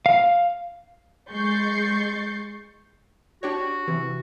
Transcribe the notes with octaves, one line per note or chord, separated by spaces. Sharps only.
F5
G#3 C#6 G6 A6 C7
D4 F#4 G4 C#5
C3 E3